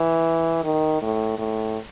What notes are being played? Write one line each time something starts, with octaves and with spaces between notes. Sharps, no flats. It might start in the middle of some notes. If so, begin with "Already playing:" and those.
Already playing: E3
D#3
A2
A2